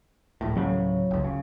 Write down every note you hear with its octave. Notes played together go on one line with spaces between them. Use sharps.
D1 A#1 A2
D2 A2 C#3 F#3
F#1 C#2
C#3